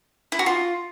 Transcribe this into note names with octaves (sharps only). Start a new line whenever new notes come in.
E4
F#4
F4